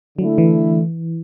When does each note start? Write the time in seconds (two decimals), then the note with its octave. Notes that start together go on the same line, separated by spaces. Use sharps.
0.18 D3 F#3 A3 E4
0.38 E3